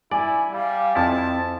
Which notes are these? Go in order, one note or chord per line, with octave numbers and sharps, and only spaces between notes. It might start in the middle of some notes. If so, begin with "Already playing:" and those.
E4 D5 G#5 D6
G3 F5
F2 F3 C4 E4 A5